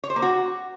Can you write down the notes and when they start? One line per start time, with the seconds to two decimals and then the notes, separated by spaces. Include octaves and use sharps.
0.04 C#5
0.10 C5
0.16 A#3
0.22 F#4